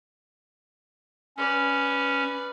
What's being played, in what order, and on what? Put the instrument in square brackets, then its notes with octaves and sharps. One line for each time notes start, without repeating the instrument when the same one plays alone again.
[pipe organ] C#4 [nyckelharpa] B4 D5